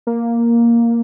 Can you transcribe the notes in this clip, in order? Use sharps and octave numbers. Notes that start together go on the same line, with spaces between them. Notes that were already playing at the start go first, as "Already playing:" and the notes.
A#3